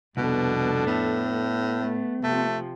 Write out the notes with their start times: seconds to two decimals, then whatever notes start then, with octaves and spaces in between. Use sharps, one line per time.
0.17 C2 F2 B2 B3 D4 A4
0.87 A2 B3
1.79 A3
2.23 C3 F3 A3